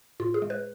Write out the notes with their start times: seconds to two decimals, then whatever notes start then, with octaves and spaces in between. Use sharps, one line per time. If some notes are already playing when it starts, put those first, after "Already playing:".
0.20 A2 F4
0.34 G#4
0.42 G#3
0.50 B4